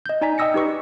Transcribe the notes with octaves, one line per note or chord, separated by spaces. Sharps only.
D#5 G6
D#4 D5 G#5 A#5 B6
D#5 G5 D#6 E6 A#6 C#7
D#4 G4 B4 C#6 C#7